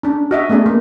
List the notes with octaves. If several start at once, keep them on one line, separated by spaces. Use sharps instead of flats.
C#4 D4
F#4 D#5 E5
A3 B3 C#4 G#4 D5
A#3